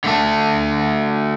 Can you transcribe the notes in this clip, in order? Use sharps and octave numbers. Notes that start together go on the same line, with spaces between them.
D3 A3 A5